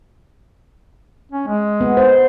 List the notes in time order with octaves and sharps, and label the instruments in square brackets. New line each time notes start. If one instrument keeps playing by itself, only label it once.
[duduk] C#4
G#3
[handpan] B3
C5